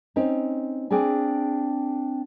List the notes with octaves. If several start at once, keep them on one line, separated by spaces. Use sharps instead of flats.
C4 C#4 D#4
C4 D4 G#4 G#5